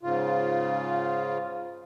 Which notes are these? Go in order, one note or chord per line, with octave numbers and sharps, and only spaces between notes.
G#2 C#3 F4